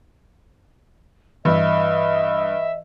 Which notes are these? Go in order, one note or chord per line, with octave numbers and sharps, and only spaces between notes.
G2 E3 D#5 E5